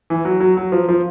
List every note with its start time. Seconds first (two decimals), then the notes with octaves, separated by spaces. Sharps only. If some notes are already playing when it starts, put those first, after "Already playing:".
0.10 E3
0.25 F#3
0.41 F#3
0.57 F#3
0.72 F3
0.88 F3